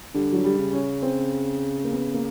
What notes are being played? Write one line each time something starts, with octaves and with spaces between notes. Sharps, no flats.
D3 G3
F#3
G3
C#3
C#4
C4
A#3
B3
A#3